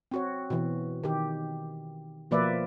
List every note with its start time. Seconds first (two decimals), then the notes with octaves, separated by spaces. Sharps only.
0.11 C4 F#4 C#5
0.50 B2 E3
1.04 D#3 G4
2.31 B2 F3 A#3 B4 D5 E5